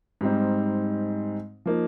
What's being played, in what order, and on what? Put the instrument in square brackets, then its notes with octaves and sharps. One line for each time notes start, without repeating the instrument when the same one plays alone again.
[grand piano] G#2 G3 C4 D#4
F3 A#3 D#4